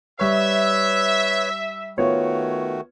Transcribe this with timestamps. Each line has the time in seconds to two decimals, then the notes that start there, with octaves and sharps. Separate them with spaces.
0.20 G3 B4 C#5 E5 C#6
1.98 D#3 A3 B3 F4 F#4 C#5